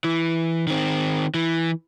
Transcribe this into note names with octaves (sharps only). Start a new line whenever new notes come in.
E3
D#3 C4
E3